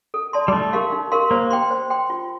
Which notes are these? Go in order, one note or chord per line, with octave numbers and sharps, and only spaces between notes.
A4
D5 A5 C6
G3
A3 D#4
G4 A#4 F5 C6
D#4
G4 A#4 F5 C6
A#3 C5
G5 C6
C5
G5 C6
F4